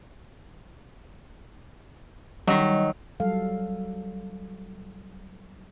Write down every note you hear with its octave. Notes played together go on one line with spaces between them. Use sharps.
D#3 F#3 G3 D#5
F#3 G3 A4 F5